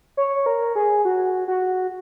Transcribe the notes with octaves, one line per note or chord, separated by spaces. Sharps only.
C#5
A#4
G#4
F#4
F#4